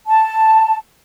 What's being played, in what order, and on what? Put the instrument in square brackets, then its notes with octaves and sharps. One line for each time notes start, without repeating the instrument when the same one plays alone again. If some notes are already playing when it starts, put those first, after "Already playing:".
[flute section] A5